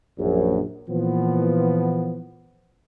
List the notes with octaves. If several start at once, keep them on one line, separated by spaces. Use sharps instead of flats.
A#1 F#2
A#2 E3 F3 B3